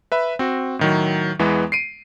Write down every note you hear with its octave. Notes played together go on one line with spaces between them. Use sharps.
B4 E5 B5
C4 F#4
A2 D#3 F#3
E2 E3 G#3 B3
C7 D7 D#7